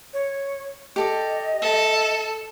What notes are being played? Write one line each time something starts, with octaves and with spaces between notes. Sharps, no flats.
C#5
G4 A4 D5 D#5
A4 E5